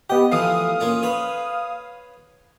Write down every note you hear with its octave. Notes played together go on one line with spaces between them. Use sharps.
B3 G4 D#5
E3 F3 A3 F5 D#6
A#3 C#4 F4
B4 C#5